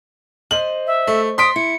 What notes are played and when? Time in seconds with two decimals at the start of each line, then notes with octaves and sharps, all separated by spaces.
0.51 C5 D#5 F#7
0.87 E5
1.07 A3
1.38 C6 D#6 B6 D7
1.56 E4 C#7